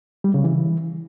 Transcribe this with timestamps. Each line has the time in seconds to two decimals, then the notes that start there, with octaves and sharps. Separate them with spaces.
0.24 G3
0.34 C#3
0.44 E3